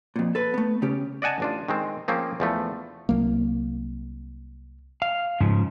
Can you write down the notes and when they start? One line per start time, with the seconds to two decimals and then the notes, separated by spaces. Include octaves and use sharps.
0.16 F2 A#2
0.35 A4 B4
0.54 A3 B3
0.82 C#3 C#4 G4
1.22 D5 D#5 F#5 G#5 A5
1.40 A1 D4 F4
1.68 D#3 G#3 C4
2.08 F3 A#3 C4 C#4 G#4
2.40 E2 F3 A3
3.09 C2 F#3 A#3
5.02 F5
5.41 G#2 C#3 F3